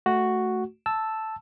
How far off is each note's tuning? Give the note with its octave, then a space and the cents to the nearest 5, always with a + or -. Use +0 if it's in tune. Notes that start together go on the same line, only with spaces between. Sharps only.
A3 +0 F#4 +0
A5 +0 E6 +0